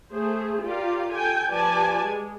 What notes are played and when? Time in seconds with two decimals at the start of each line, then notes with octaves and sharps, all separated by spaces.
0.12 A3 G#4 C5
0.63 F4 G4 A#4 D5 F5
1.12 A4 G5 G#5
1.51 F3 G4 B4 D5 G#5 A5
2.04 G#3